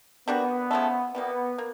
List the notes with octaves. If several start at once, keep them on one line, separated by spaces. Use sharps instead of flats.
G3 A#3 B3 D4 F#4
C#3 F3 A3
E3 G3 A#3 B3
A#3